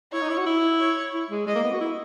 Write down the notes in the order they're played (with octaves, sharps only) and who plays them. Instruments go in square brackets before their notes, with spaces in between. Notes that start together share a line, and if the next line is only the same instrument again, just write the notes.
[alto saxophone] E4 [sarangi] C#5
[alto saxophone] D#4
E4
F#4
E4
[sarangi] C#5
[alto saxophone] E4
G#3
[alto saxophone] G#3 [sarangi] D#5
[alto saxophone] A#3
B3
F#4
E4